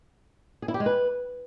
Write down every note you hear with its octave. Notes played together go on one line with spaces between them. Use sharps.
G#4
E4
G4
G#3
B4